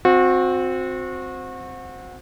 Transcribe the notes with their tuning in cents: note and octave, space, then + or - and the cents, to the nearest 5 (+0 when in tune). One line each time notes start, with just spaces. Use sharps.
C4 +0 F#4 -30